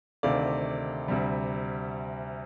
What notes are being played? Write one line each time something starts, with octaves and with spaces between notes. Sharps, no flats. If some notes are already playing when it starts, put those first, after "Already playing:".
D2 C3 D#3 A3 D5 F5
D2 C3 G3